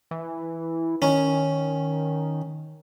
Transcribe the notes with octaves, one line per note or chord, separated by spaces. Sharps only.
E3
D#3 C#4